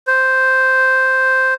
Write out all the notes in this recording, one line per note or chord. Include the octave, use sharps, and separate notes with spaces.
C5